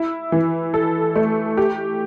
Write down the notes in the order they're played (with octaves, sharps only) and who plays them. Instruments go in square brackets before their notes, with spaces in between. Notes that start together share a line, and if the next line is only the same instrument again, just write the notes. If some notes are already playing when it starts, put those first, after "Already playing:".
Already playing: [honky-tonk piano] E4
E3
A4
A3
G4